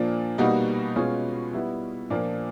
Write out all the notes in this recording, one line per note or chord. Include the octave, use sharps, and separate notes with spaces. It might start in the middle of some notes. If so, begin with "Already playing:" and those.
Already playing: A#2 F3 A#3 D4
B2 G3 A#3 D#4 F#4
B2 G#3 C#4 F4
G3 B3 E4
A#2 F3 A#3 D4